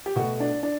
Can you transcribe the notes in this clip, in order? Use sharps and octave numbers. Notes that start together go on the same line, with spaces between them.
G4
B2 A3 F#4
D4
D4